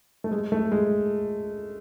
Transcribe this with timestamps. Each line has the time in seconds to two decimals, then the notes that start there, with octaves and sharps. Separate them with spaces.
0.24 A3
0.31 G#3
0.52 A3
0.72 G#3